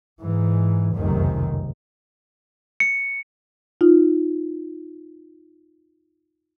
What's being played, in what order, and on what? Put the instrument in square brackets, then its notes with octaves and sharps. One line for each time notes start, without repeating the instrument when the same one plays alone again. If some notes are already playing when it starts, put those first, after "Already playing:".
[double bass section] G#2 E3
F1 C#2 F#2 C3 D#3
[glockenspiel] C#7
[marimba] D#4 F4